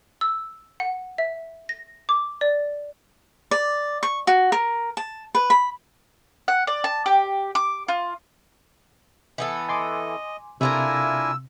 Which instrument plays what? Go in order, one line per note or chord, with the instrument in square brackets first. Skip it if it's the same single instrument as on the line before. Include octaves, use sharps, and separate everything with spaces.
[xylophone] E6
F#5
E5
A#6
D6
D5
[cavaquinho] D5
C#6
F#4
A#4
A5
B4
B5
[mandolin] F#5
D5
A5
G4
D6
F4
[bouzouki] E3 B3 A4
[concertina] D#5 [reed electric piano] G#5 C6 D6
[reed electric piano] C3 [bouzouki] A3 F4 A#4 [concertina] D4 E4 G#5 [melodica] E6